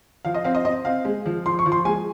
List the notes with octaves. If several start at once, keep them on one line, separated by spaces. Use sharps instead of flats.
F3 F5
D#5
C4 F5
D#5
C4 D#5
C4 F5
G#3
F3
F3 C6
C#6
F3
C6
G#3 G#5